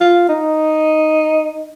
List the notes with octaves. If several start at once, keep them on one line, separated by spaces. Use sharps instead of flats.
F4
D#4